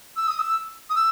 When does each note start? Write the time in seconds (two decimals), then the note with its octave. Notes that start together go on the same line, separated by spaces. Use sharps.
0.16 E6
0.27 D#6
0.39 E6
0.89 D#6
0.95 E6